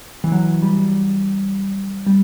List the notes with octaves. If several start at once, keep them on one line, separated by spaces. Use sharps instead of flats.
E3
F#3
G3
G3